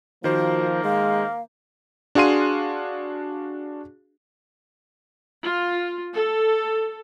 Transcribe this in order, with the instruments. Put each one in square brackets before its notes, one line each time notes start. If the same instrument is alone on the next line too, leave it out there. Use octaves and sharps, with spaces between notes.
[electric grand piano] D#3 C5 [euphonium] F3 [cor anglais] A#3 [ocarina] F#4
[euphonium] G#3 [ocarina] F5
[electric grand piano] D4 F#4 G#4 F5 C6 D#7
[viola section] F4
A4